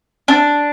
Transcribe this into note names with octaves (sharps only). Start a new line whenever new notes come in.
D4